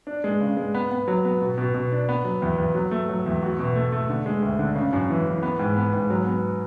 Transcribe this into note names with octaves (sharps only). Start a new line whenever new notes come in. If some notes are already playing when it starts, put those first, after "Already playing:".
D4
G#3
C#3
G#3
B3
B3
F#3
B3
B2
B2
B2
D4
B3
F#3
E2
E2
F#3
A3
F#3
E2
F#4
B2
A3
A3
D3
G#3
D2
D3
C#3
F#2
E3
E3
B3
G#2
B3
G#2
F#3
B3